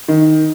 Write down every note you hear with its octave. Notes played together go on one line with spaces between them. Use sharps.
D#3